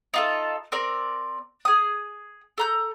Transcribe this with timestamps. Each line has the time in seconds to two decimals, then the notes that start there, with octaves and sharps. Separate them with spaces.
0.14 D#4 F4 A4
0.72 C4 A#4 D5
1.65 G#4 D#6
2.58 A4 A#5 G6